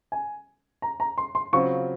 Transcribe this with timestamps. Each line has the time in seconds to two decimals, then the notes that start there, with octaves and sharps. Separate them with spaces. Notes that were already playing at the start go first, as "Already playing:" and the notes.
0.12 G#5
0.82 A#5
1.00 A#5
1.18 C6
1.35 C6
1.53 C#3 F#3 C4 F4 C#6